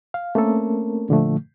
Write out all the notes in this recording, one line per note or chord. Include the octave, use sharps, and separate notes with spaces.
F5
A3 A#3 C4 C#4 A4 A#4
A#2 D3 F3 A3